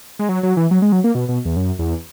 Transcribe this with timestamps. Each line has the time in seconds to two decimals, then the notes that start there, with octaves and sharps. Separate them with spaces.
0.19 G#3
0.29 F#3
0.43 F#3
0.57 E3
0.71 F#3
0.82 G#3
0.92 F#3
1.04 A#3
1.15 B2
1.29 B2
1.45 E2
1.56 F#2
1.79 E2